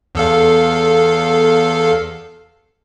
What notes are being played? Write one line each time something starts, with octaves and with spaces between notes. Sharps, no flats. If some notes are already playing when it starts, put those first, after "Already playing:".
E2 A4 F5